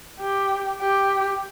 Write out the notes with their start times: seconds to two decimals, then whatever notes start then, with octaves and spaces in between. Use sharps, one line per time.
0.19 G4
0.81 G4